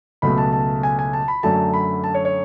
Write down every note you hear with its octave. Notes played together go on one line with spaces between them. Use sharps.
C#2 B2 F#3 A3 B5
A5
A5
G#5
G#5
A5
B5
F#2 D3 F#3 A3 A5
B5
A5
C#5
C#5